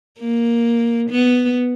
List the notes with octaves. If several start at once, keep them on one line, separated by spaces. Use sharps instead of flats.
A#3
B3